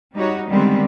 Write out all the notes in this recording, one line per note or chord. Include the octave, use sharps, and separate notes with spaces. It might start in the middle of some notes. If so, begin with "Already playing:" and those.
G3 D#4 F#4 C#5
D3 D#3 G3 G#3 B3 C4